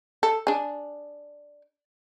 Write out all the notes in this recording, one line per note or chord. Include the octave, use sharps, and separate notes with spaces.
A4
D4 G#4